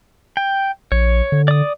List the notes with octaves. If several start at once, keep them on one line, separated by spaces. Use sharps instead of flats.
G5
A#1 C#5
D3
D5 D#6